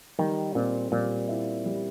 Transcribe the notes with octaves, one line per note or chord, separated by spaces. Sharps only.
D#3 G3
A#2 C4
A#2 G3
E4
G3